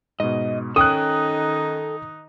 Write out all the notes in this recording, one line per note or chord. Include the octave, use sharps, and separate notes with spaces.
G#2 B2 D#5
D#3 C#4 D#4 A4 G5 D#6 F#6